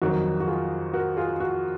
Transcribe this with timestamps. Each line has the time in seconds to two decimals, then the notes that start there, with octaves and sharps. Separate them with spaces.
0.02 F2 D#3 F#3 F#4
0.40 F#4
0.47 F4 G#4
0.94 F#4 A#4
1.17 F4 G#4
1.40 F#4